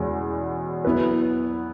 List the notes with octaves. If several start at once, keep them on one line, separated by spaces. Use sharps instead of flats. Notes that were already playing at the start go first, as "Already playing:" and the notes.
Already playing: E2 B2 G#3 C#4
F#3 B3 E4 B4